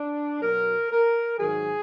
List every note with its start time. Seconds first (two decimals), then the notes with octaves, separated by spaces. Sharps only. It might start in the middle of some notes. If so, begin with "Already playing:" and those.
Already playing: D4
0.42 B2 F#3 A#4
0.91 A#4
1.39 G#2 D#3 F#3 G#4